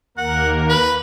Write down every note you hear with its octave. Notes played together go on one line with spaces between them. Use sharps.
D#2 A#3 A#4 F#5
B4